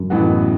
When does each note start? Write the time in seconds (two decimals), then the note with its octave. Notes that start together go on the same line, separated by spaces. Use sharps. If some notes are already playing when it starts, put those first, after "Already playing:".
Already playing: F#2
0.10 A1 A2 E3 B3 F#4